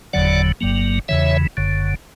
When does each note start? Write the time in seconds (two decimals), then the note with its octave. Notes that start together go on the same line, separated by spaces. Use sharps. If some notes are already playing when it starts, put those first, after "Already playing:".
0.13 F#1 E2 D3 F#3 D5 F#5
0.61 G1 G2 F#3 A#3
1.08 E2 C#3 E3 C#5 E5
1.57 F#1 F#2 D3